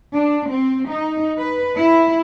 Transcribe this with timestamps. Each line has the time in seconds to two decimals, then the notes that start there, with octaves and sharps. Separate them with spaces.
0.13 D4
0.49 C4
0.90 D#4
1.37 B4
1.77 E4